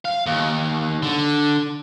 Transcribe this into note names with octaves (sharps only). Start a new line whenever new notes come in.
F5
D#2
D3